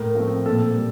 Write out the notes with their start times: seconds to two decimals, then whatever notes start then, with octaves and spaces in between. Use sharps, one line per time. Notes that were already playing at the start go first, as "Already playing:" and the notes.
Already playing: A2 A#4
0.15 F3 A3 C4
0.46 A#2 A4
0.76 G3